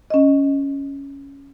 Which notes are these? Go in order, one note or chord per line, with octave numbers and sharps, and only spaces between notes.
C#4 D#5